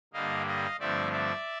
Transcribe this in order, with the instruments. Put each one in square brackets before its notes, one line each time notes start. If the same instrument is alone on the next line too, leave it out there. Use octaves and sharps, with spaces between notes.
[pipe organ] G2 D3 G3 A#3 D#5 F5
D#5 F5
G2 D3 F3 A3 C4 D5 E5
D5 E5